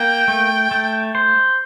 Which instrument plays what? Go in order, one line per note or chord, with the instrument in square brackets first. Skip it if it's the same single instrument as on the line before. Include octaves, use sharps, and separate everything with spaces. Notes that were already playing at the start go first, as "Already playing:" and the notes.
Already playing: [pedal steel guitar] A#3 [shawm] G5
[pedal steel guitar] A3
A3
C5